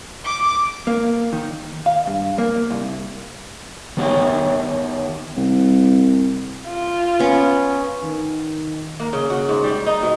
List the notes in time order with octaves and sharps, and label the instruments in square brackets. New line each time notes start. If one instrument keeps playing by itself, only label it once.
[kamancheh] D6
[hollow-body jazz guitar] A#3
D#3
F5
G2
A#3
C2
[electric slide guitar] D#3 B3 G4 C#5
[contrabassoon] C2
[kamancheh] F4
[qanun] B3 C#4
[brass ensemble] D#3
[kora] A#3
C#3
F#4
G#2
G3
D#4
B2